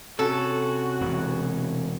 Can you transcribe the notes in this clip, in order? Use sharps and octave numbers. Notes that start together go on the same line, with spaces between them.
C3 C#4 F#4 A4
E1 A2